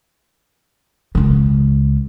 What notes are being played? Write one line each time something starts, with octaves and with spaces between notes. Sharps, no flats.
C#2 C#3